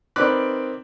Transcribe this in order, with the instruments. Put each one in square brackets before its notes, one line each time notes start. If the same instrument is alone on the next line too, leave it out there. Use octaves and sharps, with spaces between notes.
[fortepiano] D#3 C4 B4 D5 F#6